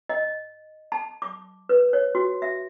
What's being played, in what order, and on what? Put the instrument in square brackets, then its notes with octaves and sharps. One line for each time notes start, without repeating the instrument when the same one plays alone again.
[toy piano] D#5
A5
D6
B4
C#5
F#4
E5